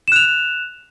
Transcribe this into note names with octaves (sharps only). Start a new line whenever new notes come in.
F#6 E7 F7